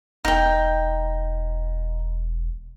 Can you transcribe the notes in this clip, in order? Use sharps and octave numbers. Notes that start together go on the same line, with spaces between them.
E1 D#4 G5